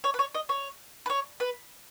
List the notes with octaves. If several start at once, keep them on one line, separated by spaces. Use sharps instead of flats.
C#5
B4
C#5
D#5
C#5
B4
C#5
B4